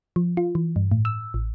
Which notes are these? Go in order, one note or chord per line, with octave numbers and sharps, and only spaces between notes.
F3
F4
E3
G2
A2
E6
A1